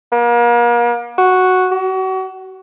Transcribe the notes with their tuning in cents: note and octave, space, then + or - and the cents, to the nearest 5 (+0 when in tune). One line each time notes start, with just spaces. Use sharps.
A#3 +40
F#4 +0
F#4 +35